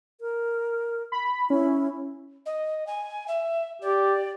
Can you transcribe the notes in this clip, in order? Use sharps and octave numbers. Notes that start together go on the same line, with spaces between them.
A#4
B5
C#4 E4
D#5
G#5
E5
G4 D5